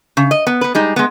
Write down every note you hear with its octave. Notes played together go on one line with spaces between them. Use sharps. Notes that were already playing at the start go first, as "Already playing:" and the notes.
C#3
D#5
B3
B3 B4
G3 G#3 D#4
G#3 B3